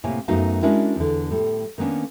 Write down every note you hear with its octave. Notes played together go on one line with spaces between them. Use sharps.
A2 C3 A#3 C#5 G#5
F#2 A3 B3 D#4 F#4 F5
G#3 C#4 D4 E4 F#4 A#4
E2 D3
A2 G3
D#3 A#3 B3 C#4 D4